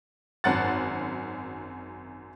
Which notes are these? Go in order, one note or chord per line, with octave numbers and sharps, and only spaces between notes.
G#1 F#2 F#5 F#6 A6